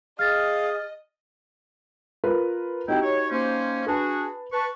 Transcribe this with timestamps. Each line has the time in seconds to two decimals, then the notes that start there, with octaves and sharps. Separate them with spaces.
0.19 G#4 D#5 F5 F6 A6
2.24 F4 A#4 B4
2.88 C4 D#4 E4 F#4 G4 G5
3.02 C#5
3.30 A#3 C#4 C5
3.87 D4 F#4 G#4 B4 A5
4.52 B4 A5 C#6